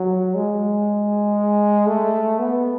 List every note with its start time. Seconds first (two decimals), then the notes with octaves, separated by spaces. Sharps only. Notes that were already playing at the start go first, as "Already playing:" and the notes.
Already playing: F#3
0.35 G#3
1.87 A3
2.39 B3